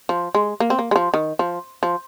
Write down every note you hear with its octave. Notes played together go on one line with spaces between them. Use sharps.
F3
G#3
A#3
C4
A#3
G#3
F3
D#3
F3
F3